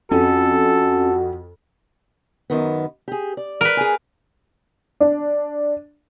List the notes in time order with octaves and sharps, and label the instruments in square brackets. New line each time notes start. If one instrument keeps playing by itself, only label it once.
[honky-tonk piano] F2 [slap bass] C#4 [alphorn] F#4 [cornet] A4
[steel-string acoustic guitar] F#2 D#3 B3
G4 G#4
D5
[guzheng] A#4 B4
[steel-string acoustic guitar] G#4 G#5
[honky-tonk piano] D4